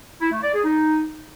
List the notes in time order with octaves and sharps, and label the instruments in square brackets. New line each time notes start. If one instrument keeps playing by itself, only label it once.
[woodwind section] E4
A3
D5
G#4
D#4